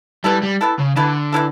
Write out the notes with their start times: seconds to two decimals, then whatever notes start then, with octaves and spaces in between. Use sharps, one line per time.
0.24 E3 G3 B3 E4 A4
0.42 G3
0.61 E3 B3 E4 A4
0.79 C#3
0.96 D3 E3 B3 E4 A4
1.32 E3 B3 E4 A4